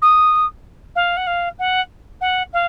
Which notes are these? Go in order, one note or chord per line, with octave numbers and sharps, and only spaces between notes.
D#6
F5
F#5
F5
F#5
F#5
F5